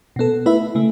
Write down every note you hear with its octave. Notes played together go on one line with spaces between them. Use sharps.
B2 B3 A4
A3 E4 B4 E5
C#3 A3